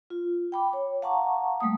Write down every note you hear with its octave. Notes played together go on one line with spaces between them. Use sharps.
F4
G5 B5 D6
C#5
F5 F#5 A5 A#5 C#6 D6
G3 A3 A#3 D#6